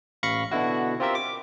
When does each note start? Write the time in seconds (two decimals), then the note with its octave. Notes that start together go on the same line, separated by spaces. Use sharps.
0.23 A1 F5 B5 C#6 A#6 C#7
0.51 B2 D3 E4 F#4
1.00 C4 F4 G4 A#4 E5
1.15 D6